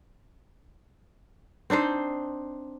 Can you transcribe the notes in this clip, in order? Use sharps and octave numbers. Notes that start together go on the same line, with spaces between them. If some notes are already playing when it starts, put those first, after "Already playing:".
C4 D4 D#4 C5